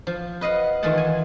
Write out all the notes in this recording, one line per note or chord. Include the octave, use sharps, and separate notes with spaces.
F3
B4 D#5 F5 F#5
D#3 E3 F4 D#5 F#5 A5
G#5